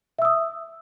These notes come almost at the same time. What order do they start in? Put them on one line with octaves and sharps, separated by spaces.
E5 E6 D#6